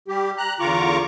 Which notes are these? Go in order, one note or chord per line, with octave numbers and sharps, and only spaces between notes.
G3 G4
A#5 F#6
E2 D3 F4 A#5 C#6 D6